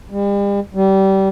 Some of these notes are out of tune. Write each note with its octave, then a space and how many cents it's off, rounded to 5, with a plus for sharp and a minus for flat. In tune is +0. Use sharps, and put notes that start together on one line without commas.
G3 +40
G3 -25